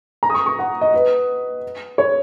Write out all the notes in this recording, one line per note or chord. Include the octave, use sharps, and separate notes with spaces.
A#5
D#6
C#6
C#6
F#5
D#5
B4
C#5